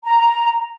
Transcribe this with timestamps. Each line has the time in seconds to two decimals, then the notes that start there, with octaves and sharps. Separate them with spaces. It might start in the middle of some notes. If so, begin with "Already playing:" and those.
0.05 A#5